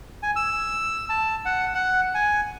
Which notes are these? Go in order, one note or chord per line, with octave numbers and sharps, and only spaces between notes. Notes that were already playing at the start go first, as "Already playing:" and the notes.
G#5
E6
A5
F#5
F#5
G#5